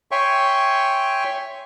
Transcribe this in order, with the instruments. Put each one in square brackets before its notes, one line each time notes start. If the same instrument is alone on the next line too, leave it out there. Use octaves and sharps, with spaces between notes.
[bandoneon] C#5 E5 G5 G#5 C6 C#6